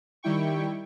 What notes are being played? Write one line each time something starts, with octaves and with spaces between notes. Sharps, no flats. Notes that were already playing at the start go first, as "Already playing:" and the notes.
D#3 G3 E4 G5 C#6